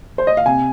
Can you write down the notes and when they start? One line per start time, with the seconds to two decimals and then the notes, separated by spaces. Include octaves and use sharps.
0.18 C5
0.27 D#5
0.37 F5
0.46 C3 G#5